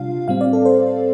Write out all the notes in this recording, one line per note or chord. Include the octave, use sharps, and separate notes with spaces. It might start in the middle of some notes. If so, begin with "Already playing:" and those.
Already playing: C3 G3 D4 F4 F5
A2 G3 C4 F5
D5
A4
C5